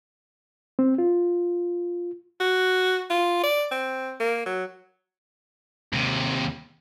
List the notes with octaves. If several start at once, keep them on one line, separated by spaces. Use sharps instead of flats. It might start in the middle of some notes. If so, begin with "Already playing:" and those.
C4
F4
F#4
F4
D5
C4
A#3
F#3
D#2 C3